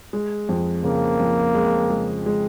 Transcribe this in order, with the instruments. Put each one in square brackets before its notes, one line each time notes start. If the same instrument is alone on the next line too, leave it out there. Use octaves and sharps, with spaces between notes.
[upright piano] G#3
F2
[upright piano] C#3 [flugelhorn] A#3
[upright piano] F2
G#3
G#3
G#3